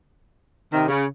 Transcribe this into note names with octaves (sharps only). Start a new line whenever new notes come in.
C3 D#3
C#3